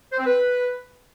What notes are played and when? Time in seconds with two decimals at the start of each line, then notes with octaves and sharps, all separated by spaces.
0.11 C5
0.19 C4
0.26 B4